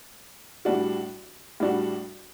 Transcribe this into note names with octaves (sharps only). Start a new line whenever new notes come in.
A2 G3 D4 F#4
A2 G3 D4 F#4